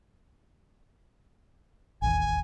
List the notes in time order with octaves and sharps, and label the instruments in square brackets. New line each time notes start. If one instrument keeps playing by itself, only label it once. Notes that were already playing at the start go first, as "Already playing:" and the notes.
[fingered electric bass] E1 A1 D#2 [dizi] G#5